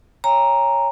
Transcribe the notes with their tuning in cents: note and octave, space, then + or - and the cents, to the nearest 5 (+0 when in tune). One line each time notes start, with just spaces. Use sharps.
C#5 +0 G5 +40 A#5 +0